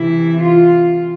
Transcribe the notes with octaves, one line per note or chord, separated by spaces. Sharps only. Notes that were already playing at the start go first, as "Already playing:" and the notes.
Already playing: C3 E3 E4
F4